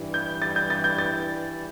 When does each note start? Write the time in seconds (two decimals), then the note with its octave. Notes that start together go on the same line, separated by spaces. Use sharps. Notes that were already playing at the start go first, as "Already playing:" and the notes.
Already playing: G2 E3 G3 E4
0.14 G6
0.42 A6
0.56 G6
0.70 A6
0.84 G6
0.98 A6